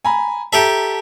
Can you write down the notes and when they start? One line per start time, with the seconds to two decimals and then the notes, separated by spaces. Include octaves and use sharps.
0.05 G#5 A#5 B5
0.53 G4 A4 E5 A5 A#5